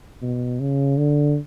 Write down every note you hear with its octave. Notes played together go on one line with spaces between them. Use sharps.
B2
C#3
D3